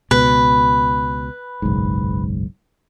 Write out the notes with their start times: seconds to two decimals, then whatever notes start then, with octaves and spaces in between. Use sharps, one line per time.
0.11 C#2 B2 B4
1.62 F#1 B1 G#2